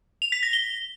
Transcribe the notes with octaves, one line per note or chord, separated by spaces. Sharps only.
F7
B6
A#6
G7